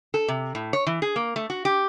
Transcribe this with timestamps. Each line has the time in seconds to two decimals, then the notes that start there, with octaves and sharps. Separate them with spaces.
0.14 A4
0.28 C3
0.55 A2
0.73 C#5
0.87 E3
1.02 G#4
1.16 A#3
1.36 A3
1.50 F#4
1.65 G4